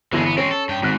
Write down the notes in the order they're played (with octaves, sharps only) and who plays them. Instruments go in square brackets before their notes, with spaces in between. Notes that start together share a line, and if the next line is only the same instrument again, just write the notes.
[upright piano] G1 E3 A#6 [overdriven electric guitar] D3 G#3
[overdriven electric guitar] B3
[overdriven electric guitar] G#3 C4 [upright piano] C#4
[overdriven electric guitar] A4
G2 G5
[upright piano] G#1 F#6 [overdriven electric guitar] G#2